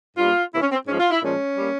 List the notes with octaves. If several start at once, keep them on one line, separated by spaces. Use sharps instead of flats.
G2 G3 A#3 F4
C3 E3 A#3 E4
C#4
C4
G#2 F3 G#3 C#4
F4
E4
A#2 F3 G#3 C#4
G3 A#3